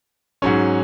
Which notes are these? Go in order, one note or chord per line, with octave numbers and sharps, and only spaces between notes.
G#2 F#3 C#4 C#5